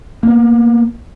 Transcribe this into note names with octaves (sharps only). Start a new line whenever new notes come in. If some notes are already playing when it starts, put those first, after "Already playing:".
A#3 B3